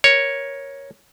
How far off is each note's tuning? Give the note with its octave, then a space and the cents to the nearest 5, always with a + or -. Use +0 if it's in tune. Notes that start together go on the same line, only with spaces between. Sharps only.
A#4 +20 C#5 +0